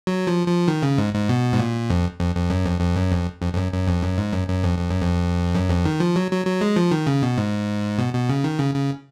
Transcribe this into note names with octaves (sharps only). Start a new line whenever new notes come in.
F#3
F3
F3
D#3
C#3
G#2
G#2
B2
G#2
A#2
F2
F2
F2
F#2
F2
F2
F#2
F2
F2
F2
F#2
F#2
F2
F#2
G#2
F#2
F#2
F2
F2
F#2
F2
F#2
F2
D#3
F3
F#3
F#3
F#3
G#3
F3
D#3
C#3
B2
G#2
B2
B2
C#3
D#3
C#3
C#3